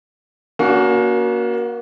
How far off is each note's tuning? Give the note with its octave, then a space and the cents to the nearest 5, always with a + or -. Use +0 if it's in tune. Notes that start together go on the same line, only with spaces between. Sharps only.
A#3 +25 C#4 +40 F#4 +0